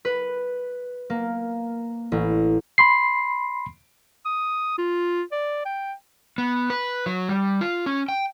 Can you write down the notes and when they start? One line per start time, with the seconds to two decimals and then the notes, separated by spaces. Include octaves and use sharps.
0.05 B4
1.10 A#3
2.12 A1
2.78 B5 C6 C7
4.26 D#6
4.78 F4
5.32 D5
5.65 G5
6.38 B3
6.70 B4
7.06 F#3
7.29 G3
7.61 F4
7.86 C#4
8.09 G5